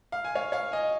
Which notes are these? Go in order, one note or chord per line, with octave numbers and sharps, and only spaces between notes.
F5
G#5
C#5 F5
C#5 F5
D#5 G#5